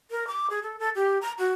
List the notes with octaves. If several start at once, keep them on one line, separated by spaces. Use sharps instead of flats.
A#4
D6
G#4
A4
A4
G4
A#5
F#4